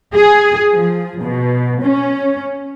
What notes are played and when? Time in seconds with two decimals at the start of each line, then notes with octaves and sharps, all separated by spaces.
0.15 G#4
0.72 F3
1.21 B2
1.83 C#4